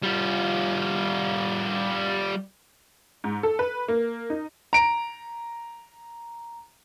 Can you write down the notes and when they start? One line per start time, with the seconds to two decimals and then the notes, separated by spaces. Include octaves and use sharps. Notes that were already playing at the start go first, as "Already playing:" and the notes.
0.02 G3 F4
3.24 G#2
3.43 A4
3.59 B4
3.88 A#3
4.30 D#4
4.73 A#5 D7